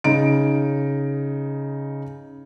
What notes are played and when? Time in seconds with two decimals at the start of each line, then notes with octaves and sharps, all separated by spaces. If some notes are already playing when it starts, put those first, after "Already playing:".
0.04 C#3 D#4 D7